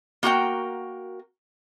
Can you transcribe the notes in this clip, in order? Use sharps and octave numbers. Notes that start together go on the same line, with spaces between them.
A#3 F#4 A#4 G5